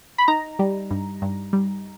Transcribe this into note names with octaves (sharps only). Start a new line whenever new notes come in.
B5
D#4 A#5
G3
G2
G2
G3